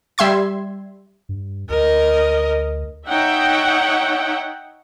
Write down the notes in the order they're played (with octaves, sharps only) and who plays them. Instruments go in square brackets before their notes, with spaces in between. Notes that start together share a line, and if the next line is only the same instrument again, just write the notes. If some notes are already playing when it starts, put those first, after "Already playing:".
[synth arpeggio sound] G3 E5 C6 G#6
[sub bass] G2
[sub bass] D2 [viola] A#4 D#5
[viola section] D#4 C#5 E5 F#5 G5